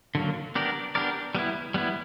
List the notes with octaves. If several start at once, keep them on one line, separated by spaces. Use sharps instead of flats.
D3 F#3 A#3
B3 D4 G4 A#4 D5
B3 D4 G4 A#4 D5
G3 B3 E4
G3 B3 E4